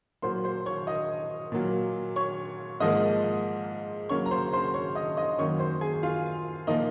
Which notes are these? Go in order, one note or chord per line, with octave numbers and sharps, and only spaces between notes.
A#2 F#3 A#3 C5 C6
C5 C6
C#5 C#6
D#5 D#6
A#2 F#3 A#3
C#5 C#6
G#2 F3 A#3 D#5 D#6
F#2 C#3 F#3 A#3 C#5 C#6
A#5
C5 C6
C5 C6
C#5 C#6
D#5 D#6
D#5 D#6
F#2 D#3 F#3 A#3 C#5 C#6
C5 C6
G#4 G#5
F4 F5
A#2 F3 A#3 D#4 D#5